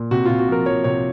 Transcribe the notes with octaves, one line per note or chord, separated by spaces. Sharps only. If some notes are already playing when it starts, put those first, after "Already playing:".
Already playing: A#2
C3 F#4
C3 F4
F#4
F3 A#4
F3 C#5
C3 C#5